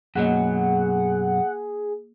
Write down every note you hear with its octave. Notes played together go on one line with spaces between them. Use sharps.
F#2 B2 F#3 A#3 G#4 D#5 F#5